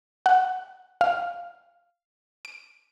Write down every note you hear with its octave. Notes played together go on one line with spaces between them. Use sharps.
F#5
F5
D7